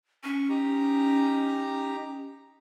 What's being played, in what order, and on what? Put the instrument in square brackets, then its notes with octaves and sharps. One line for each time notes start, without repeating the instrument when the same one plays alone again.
[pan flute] C#4 [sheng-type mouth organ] C#6
[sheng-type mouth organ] D#4 G4 A#5